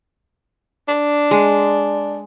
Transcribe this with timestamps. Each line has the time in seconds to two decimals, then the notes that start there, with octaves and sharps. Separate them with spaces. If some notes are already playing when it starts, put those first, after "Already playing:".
0.88 D4
1.31 G#3